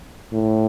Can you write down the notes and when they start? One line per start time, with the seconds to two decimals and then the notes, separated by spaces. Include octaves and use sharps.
0.33 A2